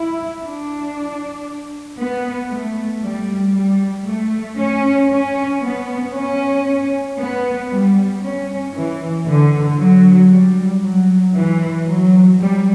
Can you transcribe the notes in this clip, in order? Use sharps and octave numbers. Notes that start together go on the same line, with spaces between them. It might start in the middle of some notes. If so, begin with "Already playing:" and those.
Already playing: E4
D4
B3
A3
G3
G3
A3
C#4
C#4
B3
C#4
B3
G3
C#4
E3
D3
F#3
G3
F#3
E3
F#3
G3